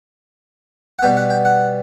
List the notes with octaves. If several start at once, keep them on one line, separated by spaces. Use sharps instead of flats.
F#5
B2 G3 B3 G5
F#5
G5
F#5